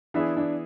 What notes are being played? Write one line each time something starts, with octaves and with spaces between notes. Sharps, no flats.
E3 B3 D4 E4 G#4
D4